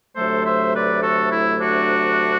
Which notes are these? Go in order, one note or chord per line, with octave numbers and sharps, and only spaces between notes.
D2 C3 F#3 A3 A4 C5
C5 E5
B4 D5
F#4 A4
E4
D4 F#4